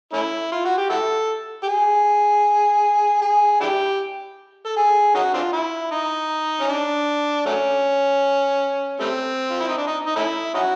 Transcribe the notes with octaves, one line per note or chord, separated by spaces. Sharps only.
A3 C#4 E4
F4
F#4
G4
E4 F#4 A4
G4
G#4
G#4
D4 E4 G4
A4
G#4
C#4 D#4 F#4
C4 D4 F4
E4
D#4
C#4
D4
F#3 A3 C#4
G3 A3 C4
F4
E4
D#4
D4
D#4
D#4
A3 C#4 E4
C#4 D#4 F#4